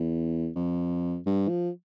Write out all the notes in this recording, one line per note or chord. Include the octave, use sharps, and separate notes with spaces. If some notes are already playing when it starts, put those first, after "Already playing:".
Already playing: E2
F2
G2
F3